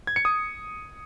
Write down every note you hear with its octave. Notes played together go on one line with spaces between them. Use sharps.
G#6
C#7
D#6